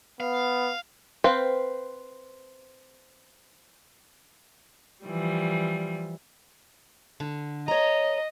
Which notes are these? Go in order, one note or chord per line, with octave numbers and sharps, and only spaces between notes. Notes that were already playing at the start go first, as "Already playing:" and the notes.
B3 F5
C4 B4 C5 F5
E3 F3 G3
D3
C#5 D#5 A#5